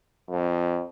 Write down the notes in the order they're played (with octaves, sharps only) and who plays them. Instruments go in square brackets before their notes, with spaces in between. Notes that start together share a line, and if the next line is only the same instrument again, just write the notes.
[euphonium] F2